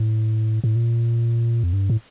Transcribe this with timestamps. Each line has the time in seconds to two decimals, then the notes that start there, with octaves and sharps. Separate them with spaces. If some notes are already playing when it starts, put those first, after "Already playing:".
Already playing: A2
0.64 A2
0.76 A#2
1.63 F2
1.73 G2
1.90 A2